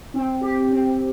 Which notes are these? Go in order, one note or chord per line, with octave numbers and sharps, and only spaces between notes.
C4
G4
C4